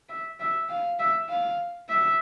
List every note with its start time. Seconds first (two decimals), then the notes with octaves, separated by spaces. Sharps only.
0.09 E5
0.40 E5
0.69 F5
0.99 E5
1.29 F5
1.89 E5